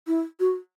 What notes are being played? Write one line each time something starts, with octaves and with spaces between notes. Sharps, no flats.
E4
F#4